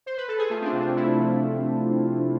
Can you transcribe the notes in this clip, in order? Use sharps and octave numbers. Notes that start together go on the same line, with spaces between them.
C5
B4
A4
G#4
A3 F4
C4
D4
C3
D4
A3 E4
F3